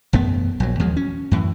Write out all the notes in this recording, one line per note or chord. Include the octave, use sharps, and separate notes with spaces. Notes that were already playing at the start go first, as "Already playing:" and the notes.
E1 F#2 A3 B3
A#1 F#3
D#2 F3 F#3 G#3
C#4
F#2 A2 E3